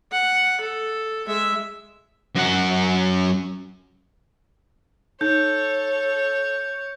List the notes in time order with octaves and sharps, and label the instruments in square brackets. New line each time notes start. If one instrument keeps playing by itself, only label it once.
[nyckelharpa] F#5
A4
G#3 E5
[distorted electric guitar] F#2 F#5
[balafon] D#4 [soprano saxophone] A4 [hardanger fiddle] C#5 [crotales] G6